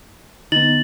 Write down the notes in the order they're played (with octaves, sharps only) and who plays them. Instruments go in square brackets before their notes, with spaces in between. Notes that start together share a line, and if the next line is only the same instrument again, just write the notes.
[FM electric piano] D3 B3 [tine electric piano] D#4 [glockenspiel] A6 F#7